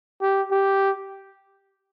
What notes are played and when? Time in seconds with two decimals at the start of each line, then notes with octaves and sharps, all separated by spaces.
0.22 G4
0.51 G4